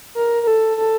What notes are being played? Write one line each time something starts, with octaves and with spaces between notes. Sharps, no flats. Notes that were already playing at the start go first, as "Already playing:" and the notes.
A#4
A#4
A4
A4